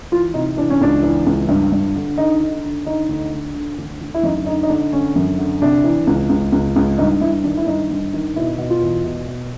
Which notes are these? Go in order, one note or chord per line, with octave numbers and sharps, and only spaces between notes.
E3 F4
C3 D#4
E3 D4
C#4
C#2 D4
E3
C#2
G2
G2
D3
D3 D#4
D3
D3
D3 D#4
D2
D3
D3
D2
D2
E4
F#2 D#4
D3 D#4
D#4
D3 D4
D3 C#4
F#2
D3
C3 D4
E3
C#2
C#2
C#2
C#2
G2 D#4
G2 E4
D#3 D4
E4
G2 D#4
G2
D#3
B2 E4
B2
F4
E2
B2
B2